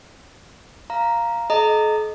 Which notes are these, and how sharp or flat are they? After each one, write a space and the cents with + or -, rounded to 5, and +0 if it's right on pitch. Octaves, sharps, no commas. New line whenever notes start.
F5 -5 A#5 +0
A4 -45 D#5 +0 A#5 -25